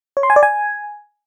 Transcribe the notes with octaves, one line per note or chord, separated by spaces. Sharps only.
C#5
C6
G#5
D5
G#5